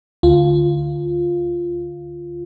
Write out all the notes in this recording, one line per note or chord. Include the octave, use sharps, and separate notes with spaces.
D2 F4